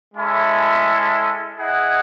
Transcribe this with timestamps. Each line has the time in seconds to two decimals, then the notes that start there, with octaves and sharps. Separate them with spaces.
0.14 G#3 C#4 E4 A4
1.59 E4 G#4 D#5 F#5